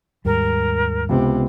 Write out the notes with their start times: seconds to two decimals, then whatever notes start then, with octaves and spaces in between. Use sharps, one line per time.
0.25 D#2 G#2 G3 A#4
1.09 C#2 C3 B3